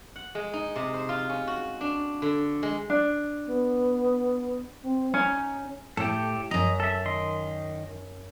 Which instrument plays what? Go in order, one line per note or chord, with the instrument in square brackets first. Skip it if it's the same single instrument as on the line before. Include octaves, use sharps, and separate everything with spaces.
[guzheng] F#5
G#3
D#4
C3
C5
F4
C#4
F#4
D4
D3
G#3
[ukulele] D4
[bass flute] B3
C4
[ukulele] C#4 [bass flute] D#4
[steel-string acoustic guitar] A2 [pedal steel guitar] G4 A4
[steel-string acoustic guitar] F#2 A#5 [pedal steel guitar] D#5
[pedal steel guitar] A4 E5
D#3 D#5 C6